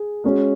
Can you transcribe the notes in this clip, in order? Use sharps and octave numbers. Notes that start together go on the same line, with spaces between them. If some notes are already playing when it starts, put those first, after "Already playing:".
Already playing: G#4
G#3 C#4 F#4